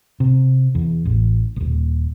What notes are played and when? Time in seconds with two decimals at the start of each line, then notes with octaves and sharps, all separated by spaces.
0.20 C3
0.75 E2
1.05 A1
1.56 D#1 G#1